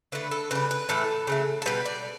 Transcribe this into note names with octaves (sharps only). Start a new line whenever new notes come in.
D3 A3 B4
A4
C#3 G3 B4
B4
A2 E3 A3 A4
C#3 F#3 A3
A4
B2 G3 B4
D5